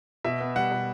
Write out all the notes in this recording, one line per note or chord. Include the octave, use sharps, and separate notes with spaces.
B2 E5
B3
G3 F#5
B2